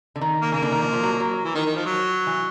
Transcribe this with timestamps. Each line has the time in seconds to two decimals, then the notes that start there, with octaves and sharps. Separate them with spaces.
0.16 D3
0.21 D#3
0.42 A#3
0.52 C#3 A#3
0.62 D3
0.72 D#3
0.82 F3
0.93 F3
1.03 F#3
1.13 F3
1.20 F#3
1.44 E3
1.55 D#3
1.65 D#3
1.76 F3
1.86 F#3
2.27 E3